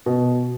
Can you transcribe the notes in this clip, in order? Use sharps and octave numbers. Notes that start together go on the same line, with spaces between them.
B2